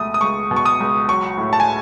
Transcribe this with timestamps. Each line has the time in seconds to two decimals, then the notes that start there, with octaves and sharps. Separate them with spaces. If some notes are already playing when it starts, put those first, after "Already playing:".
Already playing: C#2 B2 A3 D#6
0.14 D#6
0.21 C#2 C#6
0.51 B2
0.56 C#6
0.66 D#6
0.80 C#2
1.09 F#3 C#6
1.38 A2
1.53 A5
1.60 G#5